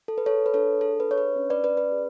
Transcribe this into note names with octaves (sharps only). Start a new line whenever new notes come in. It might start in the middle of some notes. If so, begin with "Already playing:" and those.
A4
B4
G#4 A4 C#5
B4
D4 A4 C#5
G#4 A4
B4
D4 C#5
B4
C#4
B4 D5
C#4 B4 D5
B4
G#4